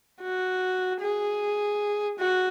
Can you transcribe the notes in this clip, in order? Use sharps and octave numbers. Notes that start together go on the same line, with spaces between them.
F#4
G#4
F#4